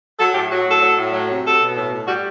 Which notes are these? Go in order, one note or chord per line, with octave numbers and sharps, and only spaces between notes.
F#3 A4
A2 G4
F#3 F#4
F#4
A2
A4
F#3
A2
F#3
C3
F#3 A4
B2
A2
A2
G3 F#4